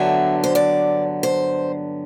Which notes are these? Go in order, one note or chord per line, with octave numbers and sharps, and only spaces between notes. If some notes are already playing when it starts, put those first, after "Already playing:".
Already playing: G2 D3 F#3 B3 E5
C5
D5
C5